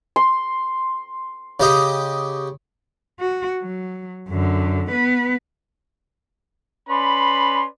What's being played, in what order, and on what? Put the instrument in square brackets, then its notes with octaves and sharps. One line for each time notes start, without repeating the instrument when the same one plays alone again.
[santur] C6
[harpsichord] C#3 G4 D#5
[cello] F#4
F#3
F#2 D3
B3 B4
[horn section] C#4 B4 D5 B5 C6